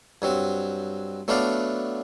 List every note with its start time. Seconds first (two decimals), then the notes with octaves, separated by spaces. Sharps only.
0.22 G2 F#3 C4
1.28 F#3 A3 B3 D4 D5 F5